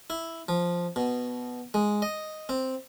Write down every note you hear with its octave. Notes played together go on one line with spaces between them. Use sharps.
E4
F3
B2
G#3
D#5
C4